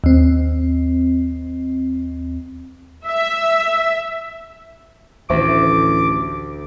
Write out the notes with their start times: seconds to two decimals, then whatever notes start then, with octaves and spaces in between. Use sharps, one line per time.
0.04 D#2 C4
3.06 E5
5.30 A1 D2 D#3 C5 E5 D6